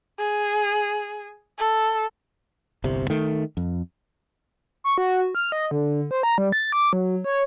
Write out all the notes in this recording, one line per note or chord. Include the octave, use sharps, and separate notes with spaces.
G#4
A4
G1 C2 C3
D#3 A3
F2
C#6
F#4
F6
D#5
D3
C5
A#5
G3
A6
D6
F#3
C#5